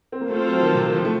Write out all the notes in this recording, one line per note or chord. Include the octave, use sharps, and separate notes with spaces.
C4
A#3
A3 C4 F4 A4 C5
F#3
F3
D#3
C3
D#3
F3
A3